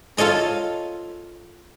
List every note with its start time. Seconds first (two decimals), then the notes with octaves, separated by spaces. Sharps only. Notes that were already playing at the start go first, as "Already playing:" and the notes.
0.17 F4 A4 C#5 D#5 A#5